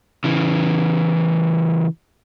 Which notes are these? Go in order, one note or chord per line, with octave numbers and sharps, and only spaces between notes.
C#3 E3